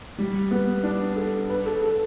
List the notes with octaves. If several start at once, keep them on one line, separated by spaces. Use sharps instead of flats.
G3
B3
D4
A4
B4
A4
A4